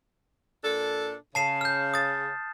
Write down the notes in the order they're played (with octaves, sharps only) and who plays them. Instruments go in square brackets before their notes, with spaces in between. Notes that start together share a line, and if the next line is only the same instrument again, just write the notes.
[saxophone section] A#2 D4 A4
[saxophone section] C#3 [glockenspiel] A5 C7 E7
[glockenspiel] F6 G6
D#6 A6